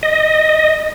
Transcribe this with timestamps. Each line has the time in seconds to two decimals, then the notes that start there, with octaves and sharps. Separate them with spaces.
0.03 D#5